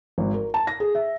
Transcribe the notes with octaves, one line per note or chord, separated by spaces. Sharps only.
G#1
A#4
A5
A#6
G#4
E5